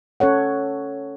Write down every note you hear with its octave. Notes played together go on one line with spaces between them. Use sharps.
C#4 A4 C#5 F#5